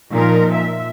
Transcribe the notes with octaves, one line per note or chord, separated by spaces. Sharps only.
A#2 F3 D#4 A#4
E5